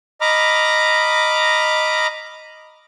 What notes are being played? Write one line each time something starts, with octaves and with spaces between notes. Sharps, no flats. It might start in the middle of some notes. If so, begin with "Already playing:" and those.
D#5 A#5 B5 D6 F6